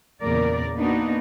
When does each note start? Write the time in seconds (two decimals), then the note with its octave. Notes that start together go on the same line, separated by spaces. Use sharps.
0.22 E2 A#2 C#3 A#3 A#4 D5
0.75 A#3 B3 D4 D#4 F#4